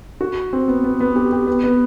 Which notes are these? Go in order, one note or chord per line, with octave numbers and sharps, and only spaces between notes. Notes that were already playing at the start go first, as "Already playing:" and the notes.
F#4
C4
B3
B3
B3
G4
G4
B3
B3